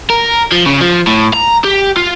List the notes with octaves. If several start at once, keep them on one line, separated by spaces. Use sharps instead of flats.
A#4
F3
C#3
F3
A2
A#5
G4
F4